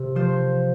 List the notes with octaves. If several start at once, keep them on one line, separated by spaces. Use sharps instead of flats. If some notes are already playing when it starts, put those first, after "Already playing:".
Already playing: C3
F3 C5